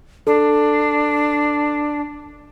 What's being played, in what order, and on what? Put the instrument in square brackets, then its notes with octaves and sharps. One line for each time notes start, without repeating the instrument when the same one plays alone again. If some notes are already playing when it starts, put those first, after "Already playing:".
[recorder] D4 [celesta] A4